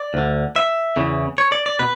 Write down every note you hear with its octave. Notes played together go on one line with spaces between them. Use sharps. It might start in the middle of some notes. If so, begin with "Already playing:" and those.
Already playing: D5
D2 D3
E5
E2 C#3 E3
C#5
D5
D5
B2 B4